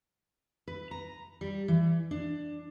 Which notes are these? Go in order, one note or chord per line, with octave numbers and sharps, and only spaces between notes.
B4
A#5
G3
E3
D4